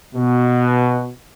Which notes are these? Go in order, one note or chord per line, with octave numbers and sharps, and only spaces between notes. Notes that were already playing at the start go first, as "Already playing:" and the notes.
B2 F#4